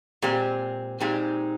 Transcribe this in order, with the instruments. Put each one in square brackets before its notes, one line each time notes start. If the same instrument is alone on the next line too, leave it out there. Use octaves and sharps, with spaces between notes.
[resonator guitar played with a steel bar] A#2 G#3 C4 G4
[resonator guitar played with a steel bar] A#2 G#3 C4 G4 [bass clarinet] D#4